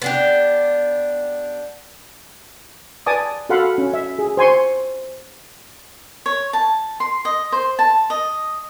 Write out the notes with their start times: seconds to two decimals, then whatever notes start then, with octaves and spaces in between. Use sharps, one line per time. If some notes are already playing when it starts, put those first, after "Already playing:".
0.02 B3 D4 G4
3.06 B4 D5 G#5 A5 D6 D#6
3.49 F#4 A4 F5 F#5 B5 C6
3.78 C#4
3.94 E5
4.19 G#4
4.37 C5 G#5 C6 C#6
6.26 C#5
6.53 A5
7.00 C6
7.25 D#5
7.52 C5
7.79 A5
8.10 D#5